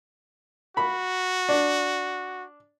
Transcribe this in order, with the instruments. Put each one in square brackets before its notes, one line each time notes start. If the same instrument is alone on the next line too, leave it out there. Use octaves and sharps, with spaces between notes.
[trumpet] F#4 [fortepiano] B5
[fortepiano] D4